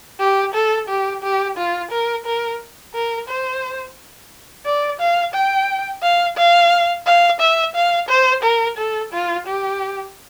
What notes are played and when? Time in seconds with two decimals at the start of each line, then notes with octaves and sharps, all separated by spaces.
0.20 G4
0.54 A4
0.89 G4
1.23 G4
1.57 F4
1.91 A#4
2.25 A#4
2.94 A#4
3.28 C5
4.66 D5
5.00 F5
5.34 G5
6.03 F5
6.37 F5
7.06 F5
7.40 E5
7.75 F5
8.09 C5
8.43 A#4
8.77 A4
9.12 F4
9.47 G4